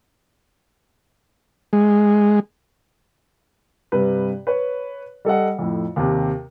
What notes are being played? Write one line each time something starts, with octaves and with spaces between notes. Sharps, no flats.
G#3
G2 C3 B4
B4 C#5
G3 A4 D#5 F#5
F2 A2
D#2 C3